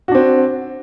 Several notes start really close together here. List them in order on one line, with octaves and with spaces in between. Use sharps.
F#4 D4 C4